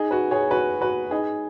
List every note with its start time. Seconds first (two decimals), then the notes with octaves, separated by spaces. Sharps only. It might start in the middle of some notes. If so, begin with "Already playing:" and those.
Already playing: D#4 G#4
0.11 F#4 B4
0.31 G#4 C#5
0.51 F#4 B4
0.81 F#4 B4
1.11 D#4 G#4